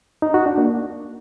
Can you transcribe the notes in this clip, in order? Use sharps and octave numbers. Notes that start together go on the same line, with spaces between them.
D#4
F#4
D4
A#3